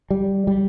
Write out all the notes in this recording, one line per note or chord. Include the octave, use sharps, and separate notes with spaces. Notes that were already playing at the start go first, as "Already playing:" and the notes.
G3
G3